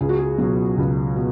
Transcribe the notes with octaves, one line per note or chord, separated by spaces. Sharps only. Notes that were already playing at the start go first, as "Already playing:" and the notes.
C#2 G#4
F#4
G#4
B2 F#3
C#2
B2